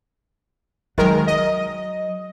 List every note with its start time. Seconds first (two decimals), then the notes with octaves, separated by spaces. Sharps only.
0.98 D#3 F#3 G#3 A#4
1.27 D#5